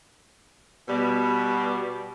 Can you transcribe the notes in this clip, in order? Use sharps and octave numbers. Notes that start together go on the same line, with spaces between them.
B2 G3